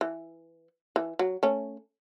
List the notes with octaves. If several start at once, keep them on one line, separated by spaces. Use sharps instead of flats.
E3
E3
F#3
A3 C#4